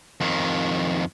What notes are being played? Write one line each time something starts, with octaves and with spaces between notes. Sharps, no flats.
F2 D#3